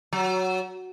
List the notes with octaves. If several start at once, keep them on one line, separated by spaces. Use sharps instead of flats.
F#3